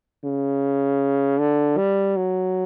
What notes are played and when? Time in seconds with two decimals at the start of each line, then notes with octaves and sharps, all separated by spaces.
0.25 C#3
1.39 D3
1.77 G3
2.16 F#3